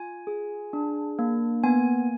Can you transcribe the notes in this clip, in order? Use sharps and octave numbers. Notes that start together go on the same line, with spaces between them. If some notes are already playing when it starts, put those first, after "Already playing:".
Already playing: F4 G#5
G#4
D4
A#3
B3 G#5